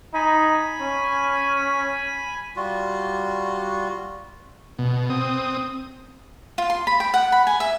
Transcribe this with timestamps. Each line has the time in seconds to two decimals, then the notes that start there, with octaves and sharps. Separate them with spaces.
0.14 D#4 G#5 B5
0.82 C#4
2.56 G3 F4 F#4
4.79 B2
5.10 C4 D#6
6.58 F4
6.70 C6
6.87 B5
7.00 G5
7.14 F#5
7.32 B5
7.47 G#5
7.60 E5